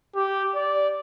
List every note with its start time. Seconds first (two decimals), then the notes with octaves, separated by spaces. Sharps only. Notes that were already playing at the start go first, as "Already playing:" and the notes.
0.15 G4
0.56 D5